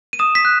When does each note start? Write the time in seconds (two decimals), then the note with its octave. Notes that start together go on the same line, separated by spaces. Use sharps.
0.13 D#7
0.19 D#6 E7
0.35 B6
0.45 F#6